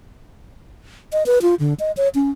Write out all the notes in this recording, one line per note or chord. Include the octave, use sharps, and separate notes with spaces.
D#5
B4
F4
D3
D#5
C#5
C#4